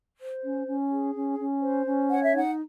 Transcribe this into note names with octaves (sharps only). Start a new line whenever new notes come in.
C5
C#4
C#4
G#4
C#4
C#4
C5
C#4
C#5 F#5
E5
D#4 F#5